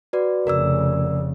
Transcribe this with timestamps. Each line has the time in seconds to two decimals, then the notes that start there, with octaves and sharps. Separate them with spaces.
0.13 F#4 B4 D5
0.47 F1 C#3 A#4 D5 E6